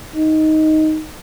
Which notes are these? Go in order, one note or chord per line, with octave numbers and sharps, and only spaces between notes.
D#4